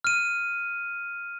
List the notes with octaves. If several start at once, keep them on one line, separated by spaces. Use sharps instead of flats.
F6 D#7